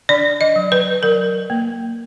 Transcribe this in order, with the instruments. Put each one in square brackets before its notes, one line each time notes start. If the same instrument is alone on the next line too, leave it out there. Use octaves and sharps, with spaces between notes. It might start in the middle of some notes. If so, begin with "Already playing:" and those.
[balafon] D4 D5
D#5
F#3
B4
F#3 A#4
A#3